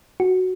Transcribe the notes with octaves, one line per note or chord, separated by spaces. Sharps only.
F#4